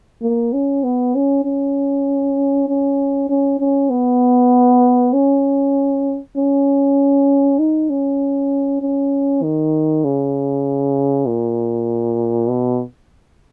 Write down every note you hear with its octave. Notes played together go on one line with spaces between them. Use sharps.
A#3
C#4
B3
C#4
C#4
C#4
C#4
C#4
B3
C#4
C#4
D#4
C#4
C#4
D#3
C#3
A#2
B2